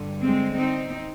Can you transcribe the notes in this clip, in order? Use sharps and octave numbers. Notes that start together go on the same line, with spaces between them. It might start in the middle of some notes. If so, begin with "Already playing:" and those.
Already playing: G2 D3
G#3 C4
C4 D#4